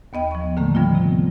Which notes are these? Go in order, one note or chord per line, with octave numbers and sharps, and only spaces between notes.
D#2 B3 D#5 G5
F3 C#6
A2 D3 D#3 A3 A#3
D3 F3 G3 B3 C4 F4
C3